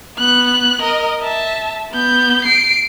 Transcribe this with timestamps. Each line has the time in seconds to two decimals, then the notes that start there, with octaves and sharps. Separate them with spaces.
0.18 B3 F#6
0.82 A#4 D#5
1.21 E5 A5
1.92 B3 G6
2.45 C7 D7